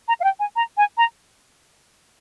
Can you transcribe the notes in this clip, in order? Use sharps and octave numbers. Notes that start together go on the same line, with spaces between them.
A#5
F5
G5
G#5
A#5
G#5
A#5